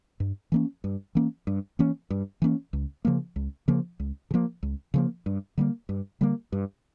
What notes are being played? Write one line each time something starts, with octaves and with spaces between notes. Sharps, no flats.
G2
E3 A#3 C#4
G2
E3 A#3 C#4
G2
E3 A#3 C#4
G2
E3 A#3 C#4
C#2
C#3 F3 A#3
C#2
C#3 F3 A#3
C#2
C#3
F3 A#3
C#2
C#3 F3 A#3
G2
D3 G3 A#3
G2
D3 G3 A#3
G2